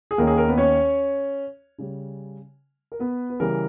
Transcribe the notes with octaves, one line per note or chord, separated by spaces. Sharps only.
G#4
D#2 D#3 A#3 C#4 A#4
G#4
A#4
B3 B4
C#4 C#5
C#3 G3 C#4
A#4
B3 B4
B4
C#3 E3 G3 A#4